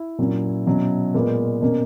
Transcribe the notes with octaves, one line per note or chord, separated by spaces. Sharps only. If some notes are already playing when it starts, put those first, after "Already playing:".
Already playing: E4
A#2 F#3 C#4
B2 F#3 C#4
A#2 G#3 B3 A#4
B2 A#3 C#4